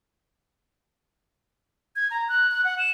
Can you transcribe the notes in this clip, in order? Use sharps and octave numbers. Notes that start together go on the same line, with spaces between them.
G#6
A#5
F#6
F#6
F#5
E7